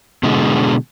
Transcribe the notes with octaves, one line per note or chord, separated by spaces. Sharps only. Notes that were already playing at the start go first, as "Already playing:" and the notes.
B2 D3 G#3